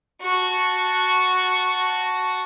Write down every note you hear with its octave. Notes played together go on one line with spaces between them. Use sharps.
F#4 A5